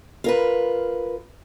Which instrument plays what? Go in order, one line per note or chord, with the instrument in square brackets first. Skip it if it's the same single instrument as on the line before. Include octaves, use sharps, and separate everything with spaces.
[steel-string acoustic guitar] F4 A#4 B4